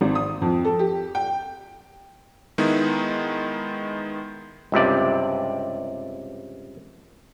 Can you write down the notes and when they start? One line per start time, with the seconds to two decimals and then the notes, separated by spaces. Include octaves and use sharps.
0.01 G#1
0.15 D#6
0.42 F2
0.65 A4
0.79 G4
1.15 G5
2.58 D#3 G#3 B3 D#4 E4
4.72 C#2 G2 C3 D5